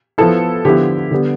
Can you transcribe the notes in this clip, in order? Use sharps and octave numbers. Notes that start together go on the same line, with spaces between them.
F3 B3 E4 A4
D3 F3 B3 E4 G4
D3 G3 B3